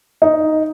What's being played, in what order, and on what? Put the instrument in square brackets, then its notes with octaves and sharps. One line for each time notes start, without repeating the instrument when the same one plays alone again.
[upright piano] D#4